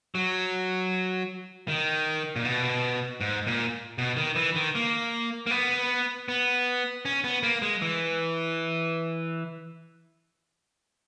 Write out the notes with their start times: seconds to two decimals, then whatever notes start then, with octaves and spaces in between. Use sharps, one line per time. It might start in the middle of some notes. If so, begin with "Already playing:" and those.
0.15 F#3
1.68 D#3
2.36 A#2
2.45 B2
3.21 G#2
3.47 A#2
3.98 B2
4.17 D#3
4.36 E3
4.56 D#3
4.75 A#3
5.47 A#3
5.51 B3
6.28 B3
7.05 C#4
7.24 B3
7.43 A#3
7.62 G#3
7.82 E3